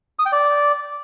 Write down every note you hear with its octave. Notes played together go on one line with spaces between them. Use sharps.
D#6
G5
D5